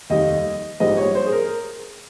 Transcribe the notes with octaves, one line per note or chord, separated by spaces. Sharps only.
F1 D#2 D#3 G3 D#5
A#1 G#2 G3 D#5
C#5
C5
G#4
A#4